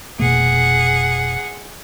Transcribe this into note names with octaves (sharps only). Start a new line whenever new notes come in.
F1 B2 A#3 G#4 F#5